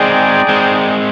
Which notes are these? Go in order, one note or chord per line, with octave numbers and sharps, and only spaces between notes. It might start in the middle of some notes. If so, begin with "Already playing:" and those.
Already playing: G#3 C4 D#4 G#4 D5 G5
G#3 C4